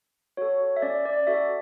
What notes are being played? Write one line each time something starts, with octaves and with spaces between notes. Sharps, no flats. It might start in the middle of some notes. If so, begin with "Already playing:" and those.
F#4 A4 C#5
E5
C#4 D5
D5
F#4 A4 E5